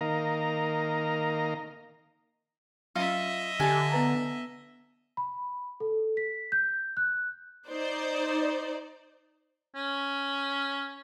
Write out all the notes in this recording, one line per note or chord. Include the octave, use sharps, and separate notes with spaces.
D#3 A#3 A#4 D#5 F5 A#5
F#3 C#4 F4 D#5 E5
D3 G4 G#5 A5
B3 B4 A#5
B5
A4
B6
G6
F#6
D#4 C5 D5
C#4